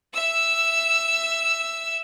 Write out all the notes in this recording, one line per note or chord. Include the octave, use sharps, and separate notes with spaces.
E5 E6